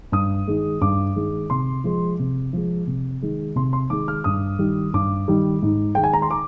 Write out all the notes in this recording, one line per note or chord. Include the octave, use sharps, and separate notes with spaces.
G2 D#6
D#3 G#3
G2 D6
D#3 G#3
C3 C6
F3 G#3
C3
F3 G#3
C3
D#3 G#3
C3 C6
C6
D#3 G#3 D6
F6
G2 D#6
D#3 G3
G2 D6
D#3 G3
G#2
D#3 G#3 G5
G#5
A#5
C6
D6